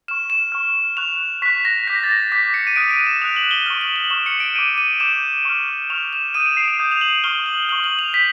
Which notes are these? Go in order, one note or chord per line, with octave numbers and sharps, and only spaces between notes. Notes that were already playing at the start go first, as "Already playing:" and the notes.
C#6 F6 E7
E7
C#6 F6
C#6 F#6 F7
C#6 F#6 B6
A#6
D6 G6 B6
A#6
A6
A#6
D6 G6 B6
C#7
D#7
D#6 F#6 D7
D#7
E7
D#6 F#6 F7
F#7
G7
C#6 F6 G7
F#7
F#7
C#6 F6 E7
C#7
D7
D6 G6 D#7
D#7
D6 G6 E7
C#6 F6
C#6 F6 F7
E7
D#6 G6 D#7
D7
C7
D7
D#6 G6
F7
F#7
C#6 F6 G7
F#7
C#6 F6 F#7
F#7
F7
G6 B6